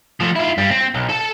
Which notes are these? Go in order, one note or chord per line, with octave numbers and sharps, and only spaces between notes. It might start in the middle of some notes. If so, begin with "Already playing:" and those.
F3 A3
E4 F4
G2 G3
C4
B1
A4 A5